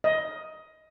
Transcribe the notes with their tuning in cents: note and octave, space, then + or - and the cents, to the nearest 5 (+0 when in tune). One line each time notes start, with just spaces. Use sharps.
D#5 +15